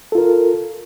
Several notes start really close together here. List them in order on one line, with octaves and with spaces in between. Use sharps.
A4 F4 A#4